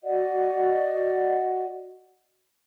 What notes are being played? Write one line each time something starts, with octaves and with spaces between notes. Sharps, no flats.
F#4 D5 D#5 F#5